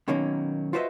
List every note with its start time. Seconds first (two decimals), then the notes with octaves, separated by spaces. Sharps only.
0.08 B2 D#3 F#3 A#3 C#4
0.73 F4 F#4 B4 C5 D#5 E5